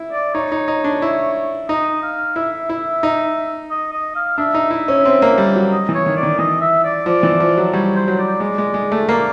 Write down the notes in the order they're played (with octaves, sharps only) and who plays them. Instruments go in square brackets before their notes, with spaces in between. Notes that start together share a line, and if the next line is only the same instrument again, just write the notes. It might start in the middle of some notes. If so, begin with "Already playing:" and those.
Already playing: [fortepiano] E4
[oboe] D5
[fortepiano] D#4 [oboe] C#5
[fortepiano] D#4
D#4
D4
E4
[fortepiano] D#4 [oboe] D#5
[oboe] F5
[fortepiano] E4 [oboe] E5
[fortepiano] E4
D#4
[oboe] D#5
D#5
F5
[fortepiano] D4 [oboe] E5
[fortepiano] D#4
E4
C#4
C4
A#3
G3
F#3
[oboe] D#5
[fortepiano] E3
[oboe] C#5
[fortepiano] D#3
[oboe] D5
[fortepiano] D#3
[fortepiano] E3 [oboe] D#5
[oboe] E5
D5
[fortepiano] F3 [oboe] D5
[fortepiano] E3
F3
F#3
[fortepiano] G3 [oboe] C#5
[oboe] C5
[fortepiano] F#3
[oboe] D5
[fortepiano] G#3 [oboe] D5
[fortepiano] G#3
G#3
A3
[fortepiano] A#3 [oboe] D5